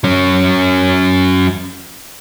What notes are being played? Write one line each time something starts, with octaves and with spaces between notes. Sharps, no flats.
F#3 C#4